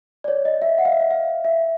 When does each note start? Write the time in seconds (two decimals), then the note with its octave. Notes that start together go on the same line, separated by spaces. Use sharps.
0.24 D5
0.28 C#5
0.45 D#5
0.62 E5
0.78 F#5
0.85 F5
0.92 E5
1.00 F5
1.11 F5
1.45 E5